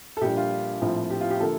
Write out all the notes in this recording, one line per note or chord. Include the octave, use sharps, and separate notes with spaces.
A4
A#1 A#2 G3 D4 G4
F4
A#1 A2 F3 C4
G4
F4
G4
D3 F3 A#3 A4